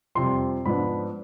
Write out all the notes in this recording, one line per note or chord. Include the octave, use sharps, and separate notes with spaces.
F2 C3 G3 C6
G#2 F3 B3 D4 B5